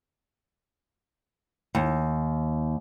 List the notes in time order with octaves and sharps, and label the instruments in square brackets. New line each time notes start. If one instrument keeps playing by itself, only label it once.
[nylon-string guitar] D#2